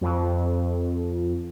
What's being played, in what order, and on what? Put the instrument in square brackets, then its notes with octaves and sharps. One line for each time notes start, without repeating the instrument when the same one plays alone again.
[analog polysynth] F2